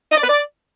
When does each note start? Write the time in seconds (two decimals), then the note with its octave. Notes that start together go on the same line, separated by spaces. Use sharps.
0.12 D#5
0.17 D5
0.23 B4
0.28 D5